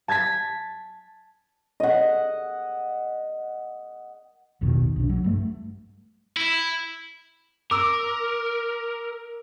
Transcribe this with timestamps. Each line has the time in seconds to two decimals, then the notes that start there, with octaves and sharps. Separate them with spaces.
0.08 A5 G#6 A6 B6
1.80 D#5 F#5
4.61 A1 E2 B2 D#3
4.96 B1 B2 D4
5.09 F#3
5.24 G2 A3
6.36 E4
7.71 A#4 D6 E6